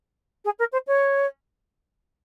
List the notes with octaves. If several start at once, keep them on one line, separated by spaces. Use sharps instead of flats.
G#4
A#4
C5
C#5